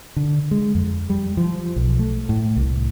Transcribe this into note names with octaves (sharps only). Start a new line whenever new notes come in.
D3
G#3
F2
G3
F3
B1
A3
A2
C2